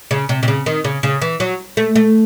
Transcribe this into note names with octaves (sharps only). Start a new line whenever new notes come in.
C#3
C3
C3
C#3
D#3
C#3
C#3
E3
F#3
A3
A3